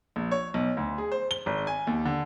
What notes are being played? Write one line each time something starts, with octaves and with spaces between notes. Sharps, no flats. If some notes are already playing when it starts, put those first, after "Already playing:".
A#1
C#5
B1
D2
G#4
C5
G7
G#1
G#5
D#2
D3